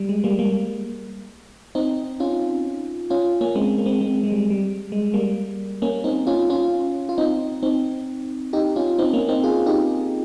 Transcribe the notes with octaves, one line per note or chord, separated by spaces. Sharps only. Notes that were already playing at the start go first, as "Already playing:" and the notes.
Already playing: G3
G#3
G3 A#3
G3 A#3
C4 D#4
C#4 F4
C#4 F4
A#3 C#4
G#3 C4
A#3
G#3 C4
G#3 C4
G#3
G3
G3
G#3
G3 A#3
A#3 C#4
C4 D#4
C#4 F4
C#4 F4
F4
C4 D#4
C4 D#4
D#4 G4
C#4 F4
C4 D#4
A#3 C#4
C4 D#4
F4 G#4
D#4 G4